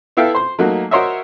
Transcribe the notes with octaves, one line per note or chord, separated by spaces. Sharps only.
B3 E4 A4 E5 F5 G5
C5 C6
F#3 A3 A#3 D#4 F#4
F#4 A#4 C5 C#5 D#5 E5